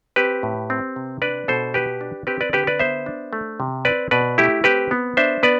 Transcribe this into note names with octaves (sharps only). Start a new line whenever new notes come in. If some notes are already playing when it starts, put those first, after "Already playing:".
C4 G4 B4
A2
C4
C3
D4 B4 D5
B2 A4 C5
B3 G4 B4
D4
C4 G4 B4
B4 D5
D3 G4 B4
B4 D5
B3 C5 E5
D4
A3
C3
C4 B4 D5
B2 B4 D5
A3 E4 G4
C4 G4 B4
B3
D4 C5 E5
B3 B4 D5